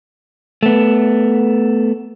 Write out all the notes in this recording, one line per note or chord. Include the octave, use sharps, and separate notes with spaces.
A3 B3